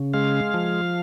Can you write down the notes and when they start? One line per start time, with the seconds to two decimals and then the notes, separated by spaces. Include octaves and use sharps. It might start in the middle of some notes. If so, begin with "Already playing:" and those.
Already playing: C#3
0.14 G#3 F5
0.54 F3